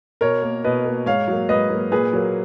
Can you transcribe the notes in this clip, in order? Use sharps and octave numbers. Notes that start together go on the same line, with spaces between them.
B2 A#4 C#5
A#3
B2 B4 D#5
A#3
G#2 C#5 F5
F#3 A#3
G#2 B4 D#5
F#3 A#3
A#2 G#4 B4
F#3 A#3